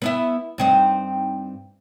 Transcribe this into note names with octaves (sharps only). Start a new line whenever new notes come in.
B3 E4 E5
G2 C4 D#4